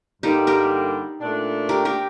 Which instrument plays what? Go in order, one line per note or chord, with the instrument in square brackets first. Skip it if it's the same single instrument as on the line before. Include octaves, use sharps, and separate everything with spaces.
[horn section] G2 D3 G3 A#3 [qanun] D#4 G4
[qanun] G4 A#4
[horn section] A#2 A3 D4
[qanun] G4 A#4
G4 A#4